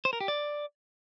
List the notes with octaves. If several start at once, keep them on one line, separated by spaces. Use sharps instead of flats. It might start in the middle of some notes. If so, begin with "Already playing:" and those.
C5
A#4
G4
D5